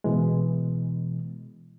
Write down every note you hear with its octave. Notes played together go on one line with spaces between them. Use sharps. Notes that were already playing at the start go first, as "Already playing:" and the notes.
B2 E3 G#3